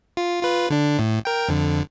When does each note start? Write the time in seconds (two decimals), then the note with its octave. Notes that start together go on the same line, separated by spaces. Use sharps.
0.17 F4
0.43 F4 B4
0.70 D3 D4
0.99 A2
1.25 A#4 G5
1.48 F2 D3